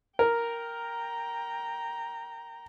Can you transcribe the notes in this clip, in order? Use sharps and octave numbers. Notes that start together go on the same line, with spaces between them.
A#4 G5 A#5